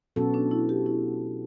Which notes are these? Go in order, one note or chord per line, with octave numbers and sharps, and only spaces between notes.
B2 F#3 B3 C#4 F#4 A4
D4
E4
G4
E4